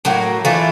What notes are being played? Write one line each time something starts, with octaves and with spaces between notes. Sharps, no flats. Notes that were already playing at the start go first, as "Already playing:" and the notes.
A2 F#3 A#3
E3 A3 D4 F4